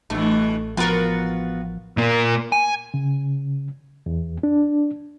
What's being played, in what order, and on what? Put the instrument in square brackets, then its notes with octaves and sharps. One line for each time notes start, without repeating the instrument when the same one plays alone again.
[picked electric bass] A1 [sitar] G2 B2 E3 [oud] A3
[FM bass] F3 [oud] B3 A#4 [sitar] F4 F#4 B4
[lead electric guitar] A#2 A#3
G#5
[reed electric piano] C#3
E2
D4